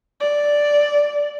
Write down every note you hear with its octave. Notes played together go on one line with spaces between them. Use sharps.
D5